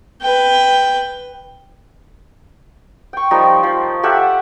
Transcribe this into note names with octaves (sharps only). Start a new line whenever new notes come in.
B4 G5
G5 C#6
F3 G3 A#3 D#4
F3
G4 A4 E5 F#5